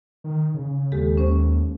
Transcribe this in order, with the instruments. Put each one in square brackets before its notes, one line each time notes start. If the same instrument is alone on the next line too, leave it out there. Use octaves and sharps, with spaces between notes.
[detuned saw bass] D#3
C#3
[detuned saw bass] D#2 [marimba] G#3 G4 A4
[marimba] C#4 C5